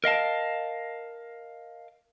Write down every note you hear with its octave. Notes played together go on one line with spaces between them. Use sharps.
A#4 D#5 F5 A5